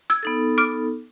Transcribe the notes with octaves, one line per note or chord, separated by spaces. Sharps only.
E6 G#6
B3 D#4 A4
D6 F6 D7